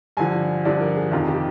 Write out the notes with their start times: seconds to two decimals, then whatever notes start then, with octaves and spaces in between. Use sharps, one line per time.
0.17 G2 D3 F3 G#5
0.65 G2 D3 F3 D5
0.81 A#4
0.96 G#4
1.11 F2 C3 D#3 F4
1.28 G4